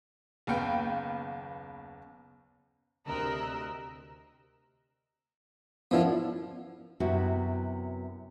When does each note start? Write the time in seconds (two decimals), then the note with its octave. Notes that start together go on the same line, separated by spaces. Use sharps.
0.47 F#1 D#2 B3 F5 G5
3.06 D2 C3 A#4 D#5 E6 F#6
5.91 F#2 D3 F3 B3 E4 F4
7.00 F#2 C3 B3 E4 F#4